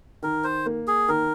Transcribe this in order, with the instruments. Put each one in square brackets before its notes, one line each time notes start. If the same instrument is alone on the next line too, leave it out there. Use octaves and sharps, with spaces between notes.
[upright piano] D#3 [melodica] A#4
[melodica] C5
[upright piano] A#3
[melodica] G#4
[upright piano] D#3 [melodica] A#4